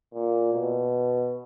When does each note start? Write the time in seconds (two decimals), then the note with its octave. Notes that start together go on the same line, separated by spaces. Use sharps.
0.13 A#2
0.53 B2